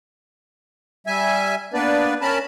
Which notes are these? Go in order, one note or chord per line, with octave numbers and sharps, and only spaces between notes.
G3 E5 G#5
A#3 B3 D4 B4 D5
C#4 A#4 A5 B5